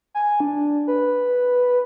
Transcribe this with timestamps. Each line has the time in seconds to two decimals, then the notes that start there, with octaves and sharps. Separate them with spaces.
0.15 G#5
0.40 D4
0.88 B4